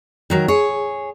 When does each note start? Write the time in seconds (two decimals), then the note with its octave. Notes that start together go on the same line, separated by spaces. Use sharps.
0.30 D#3 F#3 A#4
0.48 G#4 C#5